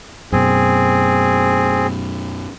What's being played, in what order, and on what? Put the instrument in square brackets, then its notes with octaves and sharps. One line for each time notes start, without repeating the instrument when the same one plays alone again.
[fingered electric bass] F#2 B2 [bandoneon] C4 G#4